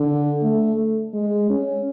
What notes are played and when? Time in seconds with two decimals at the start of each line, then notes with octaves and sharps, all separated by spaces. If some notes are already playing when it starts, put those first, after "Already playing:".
Already playing: D3
0.42 A3
1.14 G#3
1.50 C#4